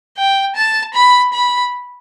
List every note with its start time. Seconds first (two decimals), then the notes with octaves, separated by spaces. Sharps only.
0.17 G5
0.56 A5
0.94 B5
1.33 B5